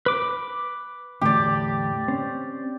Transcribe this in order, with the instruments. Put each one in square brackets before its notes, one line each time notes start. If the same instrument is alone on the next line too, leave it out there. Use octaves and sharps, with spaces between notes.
[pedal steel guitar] B4 D6
[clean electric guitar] E2 A2 D3 [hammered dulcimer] G4 D5
[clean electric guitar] C4 C#4 C5